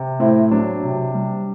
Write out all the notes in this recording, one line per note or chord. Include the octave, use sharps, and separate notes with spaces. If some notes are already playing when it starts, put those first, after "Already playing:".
Already playing: C3
A2 C4 E4
F#3 D4
C3
G3